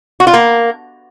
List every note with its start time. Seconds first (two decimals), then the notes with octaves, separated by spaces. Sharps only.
0.20 F#4
0.27 F4
0.34 A#3